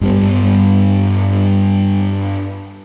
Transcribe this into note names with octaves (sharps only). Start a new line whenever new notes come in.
G2 G3 B3